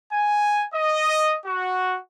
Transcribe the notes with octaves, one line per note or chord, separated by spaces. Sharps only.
G#5
D#5
F#4